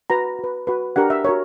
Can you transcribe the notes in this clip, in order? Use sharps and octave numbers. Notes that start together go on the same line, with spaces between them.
F#4 B4 A#5
F#4 B4
F#4 B4
D4 G4 A#4 F#5
E5
F#4 A#4 C#5